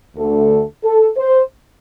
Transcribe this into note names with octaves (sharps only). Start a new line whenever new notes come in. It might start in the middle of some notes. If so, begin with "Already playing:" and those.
D2 D3 A3 A4
A4
C5